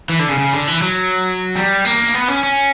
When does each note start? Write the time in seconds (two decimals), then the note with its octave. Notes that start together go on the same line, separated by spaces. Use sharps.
0.10 E3
0.19 D3
0.28 C#3
0.39 C#3
0.53 D3
0.68 E3
0.82 F#3
1.56 G3
1.85 A#3
2.14 B3
2.28 C#4
2.43 C#4